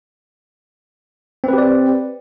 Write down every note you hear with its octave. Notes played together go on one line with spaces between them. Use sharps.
C4 G4 B4 D5